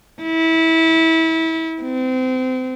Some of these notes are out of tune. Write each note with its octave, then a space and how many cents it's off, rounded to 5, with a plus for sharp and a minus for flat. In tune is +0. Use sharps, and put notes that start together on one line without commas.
E4 -25
C4 -30